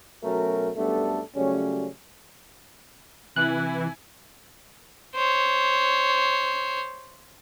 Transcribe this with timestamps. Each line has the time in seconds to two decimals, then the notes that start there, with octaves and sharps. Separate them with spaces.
0.23 B2 F#3 A3 C#4 A#4
0.77 F#2 G3 A3 B3 D4 A4
1.36 C#3 F#3 G3 A3 C#4
3.36 C3 E3 E4 G#5 F#6
5.15 C5 C#5